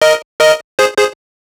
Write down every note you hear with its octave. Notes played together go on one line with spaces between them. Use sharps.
A#4 D#5
A#4 D#5
G#4 C5
G#4 C5